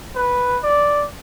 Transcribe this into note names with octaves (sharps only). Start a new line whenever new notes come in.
B4
D5